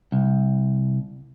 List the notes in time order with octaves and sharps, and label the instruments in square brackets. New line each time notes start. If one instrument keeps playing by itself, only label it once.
[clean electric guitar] C2